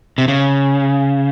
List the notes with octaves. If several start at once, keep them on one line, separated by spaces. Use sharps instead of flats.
C3
C#3